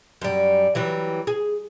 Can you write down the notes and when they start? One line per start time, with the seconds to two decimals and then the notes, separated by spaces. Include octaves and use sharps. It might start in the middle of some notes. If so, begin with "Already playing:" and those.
0.21 F#2 G3
0.75 E3 F#3 G3
1.27 G#4